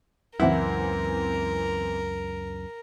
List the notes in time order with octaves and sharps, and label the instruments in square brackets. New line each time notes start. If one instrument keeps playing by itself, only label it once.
[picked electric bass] C#2 F#2 [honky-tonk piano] E3 C4 F#5 [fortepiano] E4 [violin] A#4